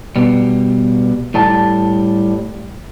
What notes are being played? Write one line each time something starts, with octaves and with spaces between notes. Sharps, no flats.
B2 G3
A2 G3 A5